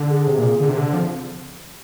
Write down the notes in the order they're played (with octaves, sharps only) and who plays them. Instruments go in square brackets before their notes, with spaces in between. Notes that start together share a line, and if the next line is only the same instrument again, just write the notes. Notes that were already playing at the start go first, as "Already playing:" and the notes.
Already playing: [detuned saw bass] D3
[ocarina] G#4
[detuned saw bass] C3
A#2
D3
C3
D3
[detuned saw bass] F3 [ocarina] C4